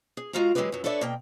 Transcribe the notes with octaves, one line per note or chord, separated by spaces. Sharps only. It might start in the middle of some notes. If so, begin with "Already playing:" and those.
G#4
G#3 F4 F#4 A#4 F5 A#5
E3 F#3 G#3 G4 G#4 B4
F#2 F#3
D4 A4 B4 C#5 D5 E5
B2 A#3 G5